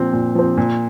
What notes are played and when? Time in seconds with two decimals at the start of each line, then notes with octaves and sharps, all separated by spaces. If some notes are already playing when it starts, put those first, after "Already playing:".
Already playing: A#2 F3 C4
0.13 A#2
0.35 F3 C4
0.58 A#2